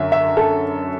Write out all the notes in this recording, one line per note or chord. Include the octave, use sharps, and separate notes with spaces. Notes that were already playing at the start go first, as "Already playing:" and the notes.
Already playing: F#2 D3 F#3 E5
E5
A4